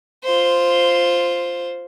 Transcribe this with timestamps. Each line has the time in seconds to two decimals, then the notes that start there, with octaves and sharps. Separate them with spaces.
0.24 F4 C5